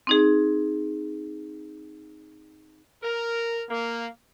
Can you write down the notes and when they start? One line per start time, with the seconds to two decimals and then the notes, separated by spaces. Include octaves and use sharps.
0.07 C4 D#4 G#4
3.03 A#4
3.69 A#3